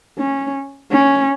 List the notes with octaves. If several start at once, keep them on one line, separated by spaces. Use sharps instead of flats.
C#4
C#4